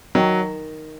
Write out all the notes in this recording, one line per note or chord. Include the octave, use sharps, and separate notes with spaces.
D#3 F#3